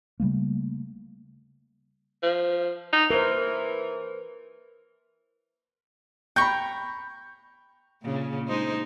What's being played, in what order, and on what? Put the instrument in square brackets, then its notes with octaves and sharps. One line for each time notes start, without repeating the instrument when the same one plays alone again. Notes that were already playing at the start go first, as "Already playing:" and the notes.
[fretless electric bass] C#3 G3 A3 A#3
[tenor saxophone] F3
D#4
[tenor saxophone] E3 [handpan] A#4 C5
[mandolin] G5 A#5 C#6 [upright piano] B5 G6
[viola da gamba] A#2 C#3
G#3 D#4 C5